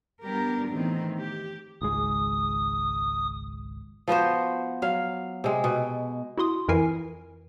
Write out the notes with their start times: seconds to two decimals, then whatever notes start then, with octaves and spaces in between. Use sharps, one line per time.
0.23 G3 B3 D4 G4 A#4
0.70 A2 D#3 E3 B3 C4
1.18 G4
1.82 G#1 C#2 G#3 D#6
4.08 F3 B3 F#4 C5
4.82 F#3 F5
5.44 C3 G#3
5.64 B2
6.38 E4 F#4 C6 D#6
6.68 F2 E3 E4 A#4 G#5 C7